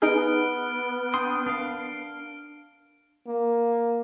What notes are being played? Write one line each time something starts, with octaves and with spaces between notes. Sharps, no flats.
B3 D#4 G#4 F6 D7
D4 G5 C6 D#6
D4 A#4 F5
A#3